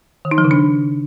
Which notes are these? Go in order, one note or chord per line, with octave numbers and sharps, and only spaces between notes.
D#3
D#4
F3
C#3
D4